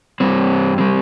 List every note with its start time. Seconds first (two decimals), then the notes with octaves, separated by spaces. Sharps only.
0.20 G2 G3 C4
0.78 G3 C4